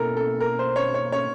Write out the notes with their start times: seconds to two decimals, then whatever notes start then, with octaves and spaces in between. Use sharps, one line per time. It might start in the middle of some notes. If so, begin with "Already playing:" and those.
Already playing: B2 A#3 C#4 E4 A4 A#4
0.17 A4
0.40 A#4
0.59 C5
0.76 C#5
0.94 C#5
1.12 C#5